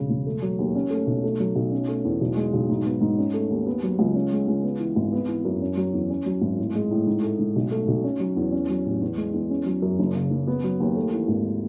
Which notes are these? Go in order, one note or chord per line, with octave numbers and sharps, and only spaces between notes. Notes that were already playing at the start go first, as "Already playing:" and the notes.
Already playing: E1 C#3
E1
A3
F#3
D#2
C#4
A3
B1
A3
F#3
B1
C#4
A3
E2
B1
G#3
B1
G#2
B3
G#2
C#4
A3
D#2
B3
F#3
C#2
C#4
G#3
C#2
B3
E3
G#1
B3
E3
F#2
C#4
F#3
E2
C#4
F#3
G#1
A2
G#3
A2
G#2
A3
G#2
B1
A3
B1
C#4
F#3
E2
C#4
F#3
A1
E2
G#3
E2
C#4
F#3
F#2
F#1
C#3
F#1
B3
F#3
D#2
A3
E3
G#1